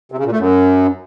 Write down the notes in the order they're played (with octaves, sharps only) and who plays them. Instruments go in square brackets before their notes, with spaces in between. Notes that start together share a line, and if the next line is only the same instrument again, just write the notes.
[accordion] C3
C#3
A#2
A3
F#2